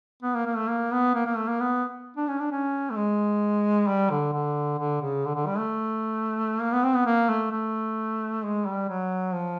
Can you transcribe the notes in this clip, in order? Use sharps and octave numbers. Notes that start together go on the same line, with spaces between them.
B3
A#3
A#3
A3
A#3
B3
A#3
A#3
A3
A#3
B3
D4
C#4
D4
C#4
A3
G#3
G3
D3
D3
D3
C#3
D3
D3
G3
A3
A#3
B3
C4
B3
A#3
A3
A3
G#3
G3
F#3
F3